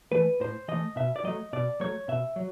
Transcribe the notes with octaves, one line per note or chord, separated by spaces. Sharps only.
E3 A3 B4
A2 C5
E3 A3 D#5
B2 E5
D5
F#3 A3 D#5
B2 D5
F#3 A3 C#5
B2 E5
F#3